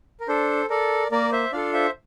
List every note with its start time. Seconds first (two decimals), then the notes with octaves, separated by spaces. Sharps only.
0.20 A#4
0.28 D4 A4 C5
0.70 A4 A#4 D5
1.12 A#3 A#4 D5
1.32 C5 E5
1.52 D4 F4 A4 D5 F5
1.73 C5 E5